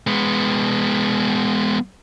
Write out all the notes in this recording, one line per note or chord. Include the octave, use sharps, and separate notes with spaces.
G#3 B3